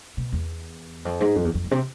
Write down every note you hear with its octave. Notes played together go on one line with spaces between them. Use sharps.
B2
E2
F2
G#2
F2
E2
F2
G#2
C3